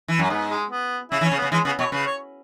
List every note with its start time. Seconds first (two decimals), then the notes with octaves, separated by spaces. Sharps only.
0.08 E3
0.19 F#2
0.30 G#2 B3
0.51 G#3
0.71 B3
1.11 C#3 E4
1.21 E3
1.25 C#4
1.32 C#3
1.38 B3
1.42 C#3
1.52 E3 G#3
1.65 C#3 B3
1.79 B2 C#5
1.92 C#3 B4
2.06 C#5